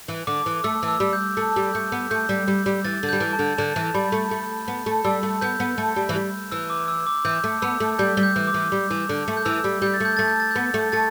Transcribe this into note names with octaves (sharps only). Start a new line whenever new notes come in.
E3
D3 D6
E3
A3 E6
E3
E6
G3
G6
A3 E6
G3
A3 G6
B3
A3 G6
G3
G3
G3
E3 A6
D3
G3 G6
E3
A5
D3
D3 A5
E3
G3 B5
A3
A3
B3
A3
G3 E6
A3
B3 G6
B3
A3
G3
E3
G3
E3 E6
D6
E6
D6
E3 G6
A3
B3 E6
A3
G3 G6
G3
G6
E3
D6
E3
G3
E3
D3
A3
G6
E3 E6
G3
G3 G6
A6
A3 G6
A3 A6
G6
A6
B3 G6
A3
A3 A6